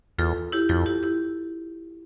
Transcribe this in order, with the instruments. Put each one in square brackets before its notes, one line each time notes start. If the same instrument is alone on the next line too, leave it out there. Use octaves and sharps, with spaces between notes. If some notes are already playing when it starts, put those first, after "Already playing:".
[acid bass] E2 [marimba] F4 A4
[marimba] E4 G4
[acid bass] F2 [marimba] F4 A4
[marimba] E4 G4
E4 G4